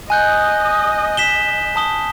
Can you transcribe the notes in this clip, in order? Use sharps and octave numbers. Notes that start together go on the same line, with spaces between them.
D#5 G#5 F#6 G6
B6 E7 G7
A5 D#6 G7